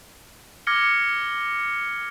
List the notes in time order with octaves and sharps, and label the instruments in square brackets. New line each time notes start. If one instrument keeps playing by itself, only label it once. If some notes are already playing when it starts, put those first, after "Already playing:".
[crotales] D6 F6 G#6 A#6 C#7 G7